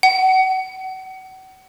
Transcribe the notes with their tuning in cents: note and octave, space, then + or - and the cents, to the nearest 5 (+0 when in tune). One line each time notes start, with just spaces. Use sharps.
F#5 +35